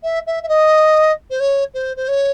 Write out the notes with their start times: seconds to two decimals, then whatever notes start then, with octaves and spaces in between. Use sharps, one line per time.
0.03 E5
0.26 E5
0.43 E5
0.48 D#5
1.30 C5
1.40 C#5
1.74 C5
1.96 C5
2.08 C#5